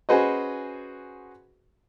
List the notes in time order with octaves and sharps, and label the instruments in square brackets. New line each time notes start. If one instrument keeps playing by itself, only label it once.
[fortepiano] C#4 F#4 G#4 B4 C5 D#5